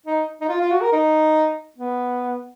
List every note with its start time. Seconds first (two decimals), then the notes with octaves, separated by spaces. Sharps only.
0.06 D#4
0.41 D#4
0.49 F4
0.60 F4
0.71 F#4
0.81 A#4
0.92 D#4
1.78 B3